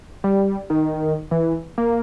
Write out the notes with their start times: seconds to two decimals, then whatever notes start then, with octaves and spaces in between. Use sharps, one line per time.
0.24 G3
0.70 D#3
1.31 E3
1.78 A#3